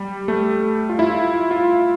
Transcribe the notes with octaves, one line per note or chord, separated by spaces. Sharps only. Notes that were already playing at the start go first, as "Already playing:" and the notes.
Already playing: G3
A3
F4
E4
F4
F4